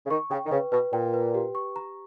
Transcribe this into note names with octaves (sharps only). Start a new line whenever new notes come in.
C#3
D#3 C#6
C#3 G5
D#3
C#3 B4
B2 B4
A#2 G5
B4
G4
C#6
A#5